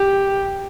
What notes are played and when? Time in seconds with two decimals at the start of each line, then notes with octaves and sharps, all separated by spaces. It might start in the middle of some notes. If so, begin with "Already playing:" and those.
Already playing: G4